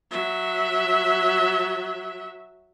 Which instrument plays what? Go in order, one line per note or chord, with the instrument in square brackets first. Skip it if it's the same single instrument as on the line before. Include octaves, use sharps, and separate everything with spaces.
[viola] F#3 E5